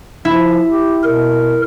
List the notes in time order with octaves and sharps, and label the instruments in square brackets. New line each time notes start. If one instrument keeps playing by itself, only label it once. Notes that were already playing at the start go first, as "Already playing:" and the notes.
[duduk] F3 [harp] E4
[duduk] G4
[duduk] B2 [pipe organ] A#4